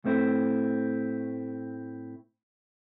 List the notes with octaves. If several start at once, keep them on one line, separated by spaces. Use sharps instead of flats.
A2 A3 C4 E4